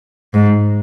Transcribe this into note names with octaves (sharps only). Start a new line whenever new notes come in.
G#2